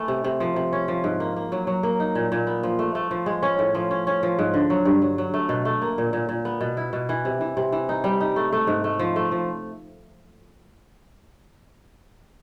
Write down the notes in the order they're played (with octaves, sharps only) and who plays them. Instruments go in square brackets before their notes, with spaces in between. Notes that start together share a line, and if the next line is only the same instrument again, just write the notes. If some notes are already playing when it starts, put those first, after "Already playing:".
Already playing: [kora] E3 A3
C3
C3
F3
C3
C#4
F3
G#2
A#3
A#3
F#3
F#3
A#3
D#4
A#2
A#2
B3
F3
A3
A3
F3
G#3
C#4
A2
F3
C#4
C#4
F3
G#2
D3
F#3
G2
F#3
F#3
A3
B2
A3
A#3
A#2
A#2
A#2
B3
B2
E4
B2
E3
C3
E3
C3
E3
D#4
G3
D#4
A3
A3
G#2
A3
F3
A3
F3